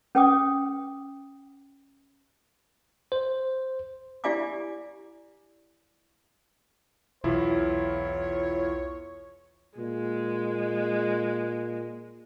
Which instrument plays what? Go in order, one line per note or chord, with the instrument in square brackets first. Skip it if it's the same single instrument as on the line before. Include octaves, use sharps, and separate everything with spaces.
[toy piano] C#4 B4 G5 D6 D#6
[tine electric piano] C5
[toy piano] E4 G4 D5 F5 G#5 D6
[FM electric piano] B1 [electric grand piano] E2 E4 F4 [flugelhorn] C#5
[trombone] A#2 [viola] G#3